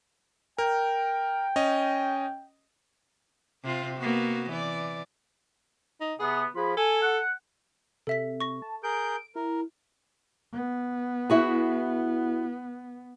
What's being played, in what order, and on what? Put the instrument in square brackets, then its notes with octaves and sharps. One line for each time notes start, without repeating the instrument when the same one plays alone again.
[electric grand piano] A#4 [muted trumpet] G5
[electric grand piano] C#4 D#5
[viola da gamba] C3 C4 F4
A#3 B3 F#4
E3 D5
[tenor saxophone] D#4
[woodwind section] C3 B3 [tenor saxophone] G#4
[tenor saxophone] F3 [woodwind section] F4 G#4 B5
[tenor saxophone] A4 [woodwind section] G#5
[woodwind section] F#5
[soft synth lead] C3 [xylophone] A4 E5 B6
[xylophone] C#6 A#6
[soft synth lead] A5
[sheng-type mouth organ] G#4 A#4 G6 [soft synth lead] D7
[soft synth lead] E4 [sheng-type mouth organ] A#4
[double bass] B3
[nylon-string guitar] E4 F#4 G#4